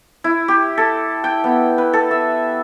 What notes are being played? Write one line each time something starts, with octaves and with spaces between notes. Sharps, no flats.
E4
G4
A4
G5
B3
B4
A4
E5